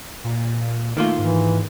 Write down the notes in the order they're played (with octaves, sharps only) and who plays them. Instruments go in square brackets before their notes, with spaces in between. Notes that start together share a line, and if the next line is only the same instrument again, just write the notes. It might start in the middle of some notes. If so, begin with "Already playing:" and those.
[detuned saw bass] A#2
[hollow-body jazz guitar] D#3 A#3 F4 [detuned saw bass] A3
[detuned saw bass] G#2 [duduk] E3